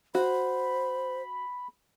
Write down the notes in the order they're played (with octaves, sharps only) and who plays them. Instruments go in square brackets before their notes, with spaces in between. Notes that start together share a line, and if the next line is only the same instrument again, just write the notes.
[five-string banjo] F#4 [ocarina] C5 [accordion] B5